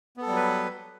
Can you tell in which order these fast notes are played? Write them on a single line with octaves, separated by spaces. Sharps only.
B3 A4 G3 F#3 B4